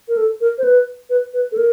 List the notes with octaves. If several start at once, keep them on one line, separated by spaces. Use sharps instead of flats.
A#4
A4
A#4
C5
B4
B4
B4
A4
A#4